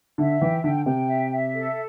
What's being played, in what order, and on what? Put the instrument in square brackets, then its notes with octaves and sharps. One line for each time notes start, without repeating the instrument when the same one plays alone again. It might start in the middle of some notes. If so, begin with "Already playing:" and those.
[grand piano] D3 [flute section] E5
[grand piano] E3 [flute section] G5
[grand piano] D3 [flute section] G5
[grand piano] C3 [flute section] G5
[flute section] E5
E5
A4